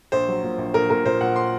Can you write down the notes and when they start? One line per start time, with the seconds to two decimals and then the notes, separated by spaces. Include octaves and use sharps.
0.12 A#1 C5
0.28 F#3
0.43 A#2
0.58 A#1
0.74 A#1 A#4
0.90 A#2 A#4
1.05 A#2 C5
1.21 A#2 F#5
1.36 C6